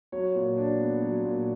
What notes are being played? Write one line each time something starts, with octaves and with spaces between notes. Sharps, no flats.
F#3 C#5
A#2
D4
B3
F#3
A#2